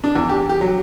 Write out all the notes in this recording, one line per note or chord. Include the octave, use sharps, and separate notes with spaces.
D4
E2
G4
G4
F#3